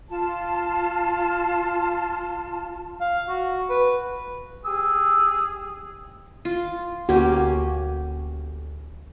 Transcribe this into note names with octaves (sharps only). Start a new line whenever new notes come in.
F4 A5
F5
F#4
B4
G4 G#4 E6
F4
D2 A#3 C#4 F#4 G4